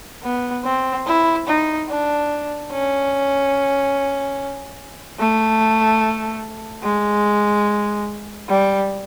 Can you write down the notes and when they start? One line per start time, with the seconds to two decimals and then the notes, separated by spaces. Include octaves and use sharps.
0.23 B3
0.64 C4
1.07 E4
1.47 D#4
1.89 D4
2.71 C#4
5.19 A3
6.83 G#3
8.49 G3